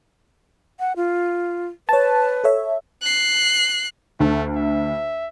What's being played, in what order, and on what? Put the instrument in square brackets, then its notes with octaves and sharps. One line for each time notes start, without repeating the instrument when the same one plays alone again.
[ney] F#5
F4
[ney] B4 [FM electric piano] C#5 A5
[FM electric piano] A4 C#5 E5
[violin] F#6 C7
[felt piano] D2 [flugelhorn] A3
[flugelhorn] E5